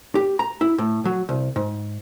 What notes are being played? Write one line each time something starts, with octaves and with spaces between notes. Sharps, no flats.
G4
A#5
E4
A2
F#3
C2
G#2